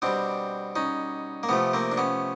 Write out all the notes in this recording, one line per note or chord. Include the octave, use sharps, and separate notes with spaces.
B2 G3 C4 D4
C#4 D#4
A#3
C3 F3 A3 B3
A#3 C4
D4
B3 C#4